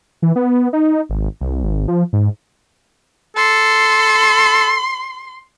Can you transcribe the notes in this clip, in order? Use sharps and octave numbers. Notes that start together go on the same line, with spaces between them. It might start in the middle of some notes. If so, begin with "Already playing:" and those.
E3
B3
D#4
G#1
C2
G#1
F3
G#2
A4 C6